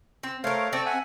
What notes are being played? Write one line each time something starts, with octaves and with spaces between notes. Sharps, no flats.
C4
A3 A#4 C5 C#5 F5
A3 C4 D5 C#6
E5 F#5 G#5